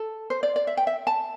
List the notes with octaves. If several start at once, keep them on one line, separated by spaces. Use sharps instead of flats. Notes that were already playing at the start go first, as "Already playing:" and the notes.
Already playing: A4
C5
D5
D5
E5
G5
E5
A5